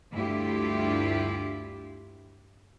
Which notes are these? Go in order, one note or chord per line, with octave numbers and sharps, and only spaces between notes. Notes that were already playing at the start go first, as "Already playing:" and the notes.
D2 G2 E4 F4 G4